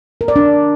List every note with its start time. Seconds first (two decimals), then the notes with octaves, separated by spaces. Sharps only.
0.21 A#4
0.28 D5
0.36 D4